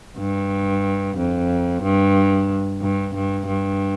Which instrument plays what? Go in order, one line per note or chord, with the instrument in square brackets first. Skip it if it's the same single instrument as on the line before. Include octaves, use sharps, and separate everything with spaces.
[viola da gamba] G2
F2
G2
G2
G2
G2